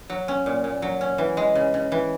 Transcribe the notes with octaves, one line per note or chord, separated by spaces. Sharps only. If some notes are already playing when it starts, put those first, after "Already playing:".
F#3
C#4
A#2
A#2
F#3
C#4
E3
G#3
C#3
C#3
E3